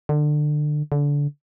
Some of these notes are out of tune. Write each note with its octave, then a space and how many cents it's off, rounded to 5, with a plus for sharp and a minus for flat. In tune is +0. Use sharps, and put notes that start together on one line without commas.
D3 +25
D3 -25